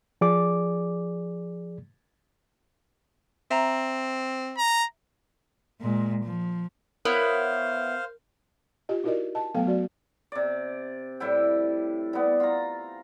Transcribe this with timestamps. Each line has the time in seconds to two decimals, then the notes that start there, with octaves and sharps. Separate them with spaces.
0.21 F3 G#4 D5 D6
3.51 C4 E5 A#5
4.58 A#5
5.81 A#2 G#3
6.24 F3
7.05 B3 E4 A#4 C5 C#5 F5
8.89 F4 G4 D#5
9.04 D#4 E4 F#4 A#4 D5 D#5
9.35 D#5 A5
9.55 F#3 A3 B3 A4 F5 G5
9.66 F#3 F#4 D5
10.32 C3 D5
11.20 A2 G3 E4 G5
12.13 G3 B3
12.40 F4 A#5